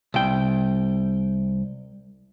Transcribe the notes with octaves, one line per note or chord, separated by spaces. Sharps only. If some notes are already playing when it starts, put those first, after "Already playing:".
C2 G5